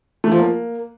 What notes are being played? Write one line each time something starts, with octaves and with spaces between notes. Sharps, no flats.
A3
F3
A#3